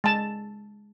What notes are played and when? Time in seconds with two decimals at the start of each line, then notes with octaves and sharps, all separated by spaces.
0.04 G#3 A5